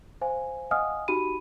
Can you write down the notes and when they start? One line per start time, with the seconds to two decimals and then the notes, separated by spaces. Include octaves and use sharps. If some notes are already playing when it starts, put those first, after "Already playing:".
0.21 C5 F5 G#5
0.71 D#5 F5 F#5 G#5 D#6 F6
1.08 D#4 F#4 G4 B5 D#7